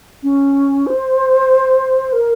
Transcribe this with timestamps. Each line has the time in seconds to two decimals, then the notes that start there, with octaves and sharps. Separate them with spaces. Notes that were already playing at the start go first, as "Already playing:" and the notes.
0.23 C#4
0.87 C5
2.13 A#4